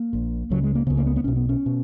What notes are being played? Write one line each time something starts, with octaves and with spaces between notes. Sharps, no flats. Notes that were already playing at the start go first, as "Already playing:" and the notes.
Already playing: A#3
A#1 A#2
C#2 C#3 F#3
G#3
A#3
C#2 C#3 B3
A#3
B3
B3
B1 B2 C#4
B3
C#4
B2